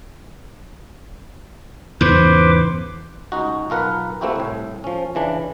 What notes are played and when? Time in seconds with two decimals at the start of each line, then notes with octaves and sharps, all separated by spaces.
2.01 E2 G#2 C#3 B4 C5 D6
3.32 C#2 D#4 F#4
3.70 B1 F4 A#4 B4 F#5
4.21 A3 A#3 C4 E4 F#4 G4
4.36 C2 A2
4.84 F3 C#4
5.15 C#3 E3 D4